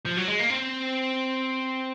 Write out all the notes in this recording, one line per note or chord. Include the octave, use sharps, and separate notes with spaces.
F3
F#3
G#3
A#3
C4